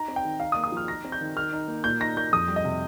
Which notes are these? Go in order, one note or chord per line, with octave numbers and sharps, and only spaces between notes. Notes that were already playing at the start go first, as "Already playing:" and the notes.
Already playing: D#4 A#5
C4
G5
D#3
D#4 F5
D#6
A#3
D#6
F3 F6
D#4 A#6
C4
G6
D#3
D#3 F6
D#4
A#3
A#2 G6
D#4 A#6
A#3 G6
F2 D#6
G3
D#5
C3